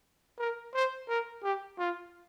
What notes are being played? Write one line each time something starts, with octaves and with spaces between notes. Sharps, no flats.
A#4
C5
A#4
G4
F4